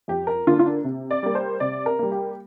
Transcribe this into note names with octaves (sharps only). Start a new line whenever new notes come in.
F2 G4
A#4
D3 A#3 D4 F4
F4
D4
C3
D5
G3 A#3
C5
C3 D5
A#4
G3 A#3
G4